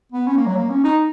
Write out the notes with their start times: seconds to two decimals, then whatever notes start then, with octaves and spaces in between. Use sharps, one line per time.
0.12 B3
0.27 C#4
0.37 A#3
0.46 F#3
0.56 A#3
0.70 C#4
0.84 D#4